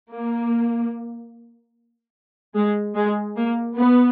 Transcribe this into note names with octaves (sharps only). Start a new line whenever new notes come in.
A#3
G#3
G#3
A#3
B3